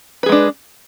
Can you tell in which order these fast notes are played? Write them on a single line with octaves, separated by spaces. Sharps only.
B4 G#4 G#3 D4